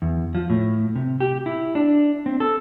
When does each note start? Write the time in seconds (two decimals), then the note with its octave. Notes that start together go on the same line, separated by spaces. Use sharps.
0.02 E2
0.35 F3
0.50 A2
0.96 C3
1.20 G4
1.46 E4
1.75 D4
2.26 C4
2.40 A4